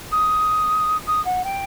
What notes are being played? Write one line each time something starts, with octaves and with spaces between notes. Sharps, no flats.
D#6
D#6
F#5
G5